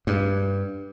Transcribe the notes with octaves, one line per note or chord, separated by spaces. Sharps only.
G2